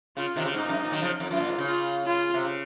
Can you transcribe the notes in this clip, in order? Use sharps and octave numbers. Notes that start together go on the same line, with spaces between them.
C#3 F4
C3 D#3
C#3
G#2 D#4
A#2
F#2
G#2
A#2
D#3 F#3
C#3 F3
F2
F#2 F4
A#2
G#2
C#3
F4
F4
C3
C#3